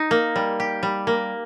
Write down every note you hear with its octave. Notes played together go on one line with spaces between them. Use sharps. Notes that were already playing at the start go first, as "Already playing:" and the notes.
Already playing: D#4
A#3
G3
G4
G3
A#3